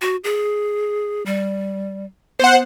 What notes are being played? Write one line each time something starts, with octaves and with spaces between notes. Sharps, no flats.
F#4
G#4
G3
B3 C5 F#5